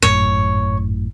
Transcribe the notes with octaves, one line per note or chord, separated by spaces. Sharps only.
G#1 F#2 A2 C#5